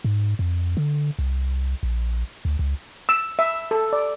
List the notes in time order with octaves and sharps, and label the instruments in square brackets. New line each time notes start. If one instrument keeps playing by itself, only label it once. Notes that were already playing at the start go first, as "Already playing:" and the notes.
[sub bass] G#2
F2
D3
C2
A#1
D2
C#2
[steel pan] E6
E5
A4
D5